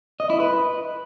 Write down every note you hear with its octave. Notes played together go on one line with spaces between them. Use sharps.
D#5
E4
B4